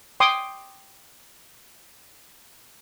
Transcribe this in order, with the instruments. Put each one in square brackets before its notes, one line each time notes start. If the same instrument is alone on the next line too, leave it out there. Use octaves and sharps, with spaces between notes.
[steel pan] G5 C6 D6 D#6